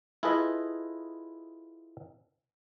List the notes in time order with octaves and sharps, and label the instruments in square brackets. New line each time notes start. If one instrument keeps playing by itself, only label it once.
[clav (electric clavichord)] E4 F4 G#4 A4 B4 D#5